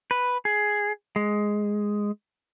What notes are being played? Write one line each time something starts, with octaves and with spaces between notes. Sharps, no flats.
B4
G#4
G#3